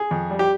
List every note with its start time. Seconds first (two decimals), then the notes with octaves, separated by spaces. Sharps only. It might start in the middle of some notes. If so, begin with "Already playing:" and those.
Already playing: G#4
0.11 F2
0.30 G3
0.39 G4